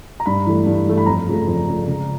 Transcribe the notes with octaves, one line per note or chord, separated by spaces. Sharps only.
A#5
G2 B5
E3 A3
G2
E3 A3
B5
F2 A#5
C#3 F3 A3
F2
C#3 F3 A3
C#2